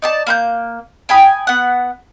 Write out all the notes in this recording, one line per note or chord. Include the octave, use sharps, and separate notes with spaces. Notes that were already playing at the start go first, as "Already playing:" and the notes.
D#4 D5 A5
A#3 B5 G6
G5 G#5 B5 D#6
B3 F#5